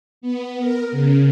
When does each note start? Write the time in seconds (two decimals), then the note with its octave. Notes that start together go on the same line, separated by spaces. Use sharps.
0.21 B3
0.60 A#4
0.92 C#3